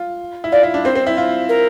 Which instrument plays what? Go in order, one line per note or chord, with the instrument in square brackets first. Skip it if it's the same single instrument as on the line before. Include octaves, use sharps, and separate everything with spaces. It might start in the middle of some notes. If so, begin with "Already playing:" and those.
Already playing: [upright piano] F4
E4
[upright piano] F4 [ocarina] D5
[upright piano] E4
D4
[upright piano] C4 [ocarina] C5
[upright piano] C4
E4
F4
[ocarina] A#4